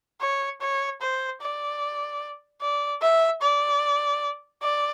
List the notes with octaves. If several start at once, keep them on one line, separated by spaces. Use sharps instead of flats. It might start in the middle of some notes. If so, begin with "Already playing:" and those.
C#5
C#5
C5
D5
D5
E5
D5
D5